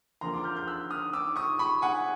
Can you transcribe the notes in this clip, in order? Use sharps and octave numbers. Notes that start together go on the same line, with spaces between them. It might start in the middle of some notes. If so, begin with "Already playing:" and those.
D3 F3 A#3 A#5 C6
C6 D6
F6 G6
F6 G6
E6 F#6
D#6 F6
D6 E6
C#6 D#6
B5 C#6
F#5 G#5